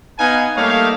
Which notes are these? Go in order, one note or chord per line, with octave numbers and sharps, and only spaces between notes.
B3 D#4 B4 F5 G#5
G3 A3 A#3 D#4 C#5 F5